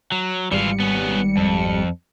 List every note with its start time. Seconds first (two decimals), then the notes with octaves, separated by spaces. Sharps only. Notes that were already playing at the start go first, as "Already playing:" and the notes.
0.12 F#3
0.51 G#1 E3 G3 F4 C#7
0.80 B3 C#4
1.37 F2